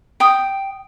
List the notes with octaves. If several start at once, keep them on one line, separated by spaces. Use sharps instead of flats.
G5 D#6